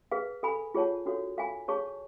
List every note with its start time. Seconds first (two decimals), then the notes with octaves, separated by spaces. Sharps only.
0.12 G#4 B4 F5
0.43 A4 F5 G#5 B5
0.75 F4 G#4 C#5 F#5 A5
1.06 D4 F#4 A4 C#5 F5
1.37 A4 F5 G#5 B5
1.68 G#4 C#5 F5 A5 C#6